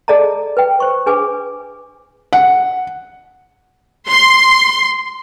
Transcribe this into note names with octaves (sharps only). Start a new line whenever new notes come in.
G#4 A4 D5 D#5 A5 A#5
B4 G5
C5 C#6
D4 G#4 B4 G#5 D6
F#5
C6